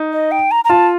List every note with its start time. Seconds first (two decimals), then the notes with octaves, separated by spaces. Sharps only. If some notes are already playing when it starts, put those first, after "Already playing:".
Already playing: D#4
0.12 D#5
0.31 G5
0.51 A#5
0.65 A#5
0.70 F4 A5